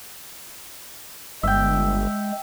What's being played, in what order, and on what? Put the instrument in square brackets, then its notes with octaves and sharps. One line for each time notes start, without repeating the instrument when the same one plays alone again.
[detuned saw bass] G1 [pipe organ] G#3 [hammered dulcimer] E5 G5